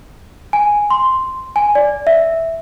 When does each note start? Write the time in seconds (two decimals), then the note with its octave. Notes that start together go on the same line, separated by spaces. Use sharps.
0.53 G#5
0.90 C6
1.56 G#5
1.75 D5
2.07 E5